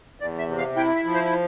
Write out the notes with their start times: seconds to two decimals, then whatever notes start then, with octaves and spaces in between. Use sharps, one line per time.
0.20 E2 D5
0.39 E5
0.48 C3
0.58 F5
0.76 E4 G5
0.95 E5
1.05 F3
1.14 C5